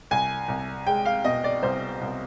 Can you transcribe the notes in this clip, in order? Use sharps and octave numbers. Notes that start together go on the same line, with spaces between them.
C2 G#5
C2
G#3 G5
F5
B2 D#5
D5
C2 C5
C2